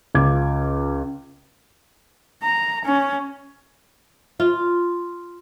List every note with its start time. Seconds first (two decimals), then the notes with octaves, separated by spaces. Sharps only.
0.15 C#2 F4 D6 G#6
2.43 A#5
2.85 C#4
4.40 F4